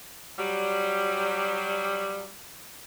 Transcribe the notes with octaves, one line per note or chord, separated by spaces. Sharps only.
F#3 G3